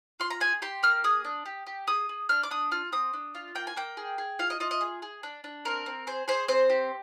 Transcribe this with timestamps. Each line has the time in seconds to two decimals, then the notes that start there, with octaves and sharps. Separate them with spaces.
0.20 F4 C6
0.30 A#5
0.40 G#4 G#5
0.62 G4 C6
0.83 A#3 F6
1.04 G#4 D#6
1.24 D4
1.46 G4
1.66 G4
1.87 G#4 D#6
2.09 G#4
2.29 D4 F6
2.43 D6
2.51 D4 D#6
2.72 F4 F6
2.92 C4 D#6
3.13 D4
3.35 F4
3.55 A#3 G5
3.67 G#5
3.77 A#3 G5
3.97 G#4
4.18 G#4
4.39 F4 F5
4.50 D#5
4.60 F4 D#5
4.71 D#5
4.81 G#4
5.02 G#4
5.23 D4
5.44 D4
5.65 C4 A#4
5.86 C4
6.07 G#4 C5
6.28 G#4 C5
6.48 C4 C5
6.70 G4